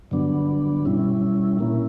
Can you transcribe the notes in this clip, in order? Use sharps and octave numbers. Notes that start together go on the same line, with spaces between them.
G2 D3 F#3 B3 D4
B2 G3 C#4 E4
A#2 A#3 C#4 E4